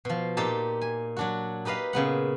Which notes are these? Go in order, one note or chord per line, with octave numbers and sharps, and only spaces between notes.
B2 F3
A#2 D#4 G4 A5
G#5
F#3 D4 F#4
D#4 G4 B4 D#5 F5
A#2 C#3 B3 F#5